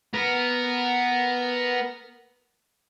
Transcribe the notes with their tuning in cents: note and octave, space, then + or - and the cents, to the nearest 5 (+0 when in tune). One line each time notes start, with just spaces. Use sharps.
B3 +0 A#4 +0